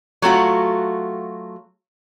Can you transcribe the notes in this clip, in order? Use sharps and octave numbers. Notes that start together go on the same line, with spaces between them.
F#3 A3 F4 F#4